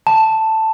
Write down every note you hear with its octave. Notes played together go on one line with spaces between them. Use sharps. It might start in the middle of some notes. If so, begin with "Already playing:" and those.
A5